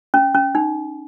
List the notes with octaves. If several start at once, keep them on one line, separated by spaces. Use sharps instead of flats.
C#4
C#4
D#4